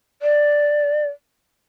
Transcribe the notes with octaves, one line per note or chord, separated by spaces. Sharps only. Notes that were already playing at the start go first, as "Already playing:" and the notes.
D5